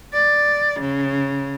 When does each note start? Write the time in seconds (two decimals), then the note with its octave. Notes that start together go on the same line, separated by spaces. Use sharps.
0.13 D5
0.80 C#3